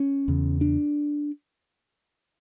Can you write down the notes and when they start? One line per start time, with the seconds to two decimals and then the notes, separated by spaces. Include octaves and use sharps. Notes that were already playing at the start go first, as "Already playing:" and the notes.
Already playing: C#4
0.28 E2 C#3
0.61 D4